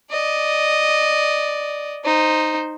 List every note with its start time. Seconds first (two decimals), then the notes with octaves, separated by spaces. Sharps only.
0.11 D5 D#5
2.05 D#4 C5